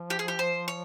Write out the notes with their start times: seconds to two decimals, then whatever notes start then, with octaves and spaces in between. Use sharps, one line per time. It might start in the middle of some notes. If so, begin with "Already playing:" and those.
Already playing: F3
0.10 G4
0.19 G#4
0.28 G4
0.39 C5
0.68 C#5